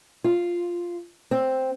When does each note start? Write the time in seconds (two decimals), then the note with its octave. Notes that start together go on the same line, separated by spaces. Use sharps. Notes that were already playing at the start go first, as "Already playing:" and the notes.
0.24 F4
1.31 C4